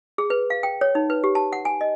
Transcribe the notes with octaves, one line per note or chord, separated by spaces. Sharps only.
G#4
B4
F5
G5
C#5
D#4
B4
G4
A5
F#5
G#5
D#5